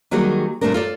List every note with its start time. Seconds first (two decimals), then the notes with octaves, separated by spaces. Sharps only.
0.11 D#3 F#3 G3 A#3 F#4 G#4
0.61 A#2 G3 A3 C4 D4 A#4
0.74 F4 A4 D5